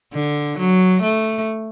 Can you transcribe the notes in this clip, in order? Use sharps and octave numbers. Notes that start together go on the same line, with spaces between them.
D3
F#3
A3